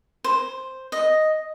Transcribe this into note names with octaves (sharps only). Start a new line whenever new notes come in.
C5
D#5